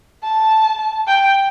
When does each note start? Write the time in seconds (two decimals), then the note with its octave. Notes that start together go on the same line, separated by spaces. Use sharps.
0.23 A5
1.07 G5